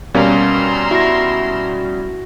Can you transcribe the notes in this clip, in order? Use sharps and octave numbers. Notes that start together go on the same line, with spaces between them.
B2 G3 A#3 C#4 A#5 C6 E6
E4 F#4 A#6